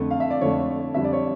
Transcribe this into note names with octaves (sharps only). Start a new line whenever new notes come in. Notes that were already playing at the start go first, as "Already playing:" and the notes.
Already playing: F2 D3 A3
F5
E5
D5
F2 D3 A3 C#5
F2 D3 G3 E5
D5
C#5